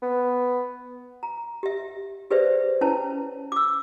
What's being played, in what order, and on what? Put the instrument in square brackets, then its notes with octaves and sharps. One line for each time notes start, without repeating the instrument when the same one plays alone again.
[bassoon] B3
[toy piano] A#5
G4 E5
G4 G#4 B4 C5 D5 E5
C#4 E4 B4 C#5 A5
D6 E6